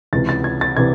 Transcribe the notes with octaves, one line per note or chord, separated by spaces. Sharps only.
C#2 C3 E3 A6
A6
G#6
A6
C3 E3 G#6